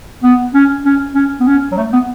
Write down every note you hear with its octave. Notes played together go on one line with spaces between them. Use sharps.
B3
C#4
C#4
C#4
B3
C#4
F#3
A3
B3